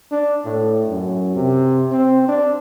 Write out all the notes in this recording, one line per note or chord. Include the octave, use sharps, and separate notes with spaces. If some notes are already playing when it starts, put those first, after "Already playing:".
D4
A2
F#2
C3
C4
D4